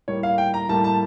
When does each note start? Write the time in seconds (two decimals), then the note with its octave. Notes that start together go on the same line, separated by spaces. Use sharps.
0.08 A2 G3 A#3 C#5
0.23 F5
0.38 G5
0.54 A#5
0.69 A2 G3 A#3 A5
0.84 A5